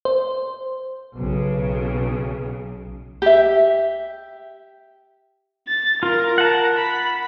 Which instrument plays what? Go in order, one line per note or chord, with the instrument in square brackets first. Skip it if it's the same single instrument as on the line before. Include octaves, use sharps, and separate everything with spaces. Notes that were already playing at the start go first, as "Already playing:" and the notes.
[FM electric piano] C5
[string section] B1 C#3
[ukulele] G4 E5
[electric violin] A6
[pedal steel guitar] F4 [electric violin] A#4
[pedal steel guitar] F#5 A5
[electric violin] B5